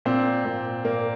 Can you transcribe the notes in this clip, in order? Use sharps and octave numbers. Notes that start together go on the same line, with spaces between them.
A#2 C4
A#2
A#2 A#3